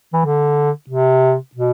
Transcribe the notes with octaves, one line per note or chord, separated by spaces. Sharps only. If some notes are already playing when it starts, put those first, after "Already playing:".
E3
D3
C3
B2